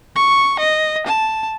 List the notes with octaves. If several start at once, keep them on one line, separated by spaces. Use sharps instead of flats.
C#6
D#5
A5